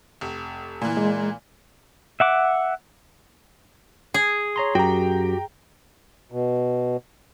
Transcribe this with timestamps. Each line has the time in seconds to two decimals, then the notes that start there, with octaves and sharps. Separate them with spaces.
0.21 F1
0.82 A#2 E3
0.97 G#3
2.20 E5 F#5 D6
4.14 G#4
4.56 C#5 A#5 C6
4.75 F#2 F#4 G4 G5 A#5
6.32 B2